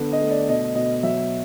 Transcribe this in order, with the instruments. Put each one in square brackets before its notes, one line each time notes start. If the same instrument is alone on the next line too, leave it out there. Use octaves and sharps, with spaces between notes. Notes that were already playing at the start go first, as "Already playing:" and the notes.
Already playing: [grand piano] D3 B3
D#5
A3
D5
B2 D#5
B2 D#5
F#3 E5